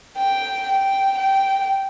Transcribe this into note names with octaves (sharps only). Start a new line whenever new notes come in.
G5
G5
G5